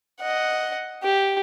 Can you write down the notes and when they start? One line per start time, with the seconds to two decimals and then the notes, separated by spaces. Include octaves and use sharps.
0.21 D#5 F#5
1.03 G4